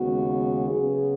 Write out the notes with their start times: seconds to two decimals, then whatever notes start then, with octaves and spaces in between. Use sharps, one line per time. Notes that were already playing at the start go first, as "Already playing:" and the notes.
Already playing: D#2 C#3 G#3 B3 F#4
0.69 C#3 F#3 B3 G#4